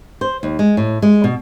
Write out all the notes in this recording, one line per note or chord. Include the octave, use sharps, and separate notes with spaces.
C5
D#2
G#3
A2
G#3
B2